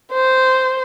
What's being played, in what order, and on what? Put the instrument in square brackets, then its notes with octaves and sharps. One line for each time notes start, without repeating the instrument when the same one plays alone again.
[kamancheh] C5